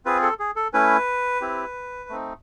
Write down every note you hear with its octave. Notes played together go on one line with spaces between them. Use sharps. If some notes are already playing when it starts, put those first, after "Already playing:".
C4 F4 G#4 B4
A4
G#4
A4
A3 C#4 E4 B4
C4 E4 G4
A3 C4 D#4